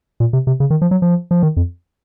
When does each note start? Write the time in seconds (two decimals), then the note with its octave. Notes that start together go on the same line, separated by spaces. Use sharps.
0.20 A#2
0.33 C3
0.47 C3
0.60 C#3
0.70 D#3
0.82 F3
0.91 F#3
1.02 F3
1.31 F3
1.43 D#3
1.57 F2